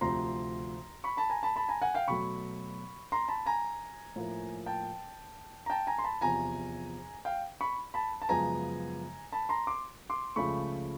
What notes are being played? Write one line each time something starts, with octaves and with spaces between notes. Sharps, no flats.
D2 C3 F3 A#5 C6
B5 C#6
A5 B5
G#5 A#5
A5 B5
A5 B5
G#5 A#5
F#5 G#5
F5 G5
B2 F#3 A3 B5 C#6
A#5 C6
A5 B5
G#5 A#5
A2 F3 A#3
G5 A5
A#5
G5 A5
G#5 A#5
C6
A5 B5
E2 C3 F3 G#5 A#5
F5 G5
B5 C#6
A5 B5
A5
F#2 C#3 F3 G#3 B3 G#5 A#5
A5 B5
A#5 C6
C6 D6
C6 D6
C#2 C#3 F3 A3 B5 C#6